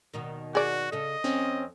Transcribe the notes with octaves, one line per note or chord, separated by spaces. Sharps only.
D#2 B2 D#3
F#4 G#4 D5
C#3 A4 D#5
F2 C4 C#4